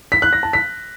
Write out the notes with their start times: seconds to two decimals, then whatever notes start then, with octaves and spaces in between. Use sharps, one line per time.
0.12 B6
0.22 F#6
0.33 A#6
0.43 A5
0.53 B6